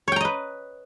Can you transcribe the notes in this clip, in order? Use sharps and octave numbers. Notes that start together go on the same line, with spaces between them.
B4 C#5 D#5 G5 A#5